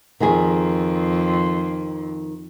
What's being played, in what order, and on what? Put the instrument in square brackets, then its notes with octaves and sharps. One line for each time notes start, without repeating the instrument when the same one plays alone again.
[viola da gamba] F2 [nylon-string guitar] D#3 G#4